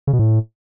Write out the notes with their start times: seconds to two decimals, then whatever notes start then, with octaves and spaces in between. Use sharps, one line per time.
0.07 C#3
0.13 B2
0.19 A2